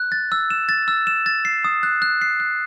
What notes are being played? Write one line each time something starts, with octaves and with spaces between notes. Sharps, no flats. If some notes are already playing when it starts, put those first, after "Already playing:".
Already playing: F#6
A6
E6
E7
A6
E6
E7
A6
C7
D#6
F#6
F#6
C7
F#6